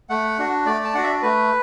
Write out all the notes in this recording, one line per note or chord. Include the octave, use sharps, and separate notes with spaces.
A3 F#5
D4 F#4
A3 D5
A5
D4 F#4 F#5
E5
D5
A3 B4